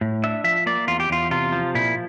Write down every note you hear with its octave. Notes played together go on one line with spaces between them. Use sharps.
A2
D4 E5
F3 E5
A#3 D5
E2 F4
G4
E2 F4
C3 F4
F3
A#2 E4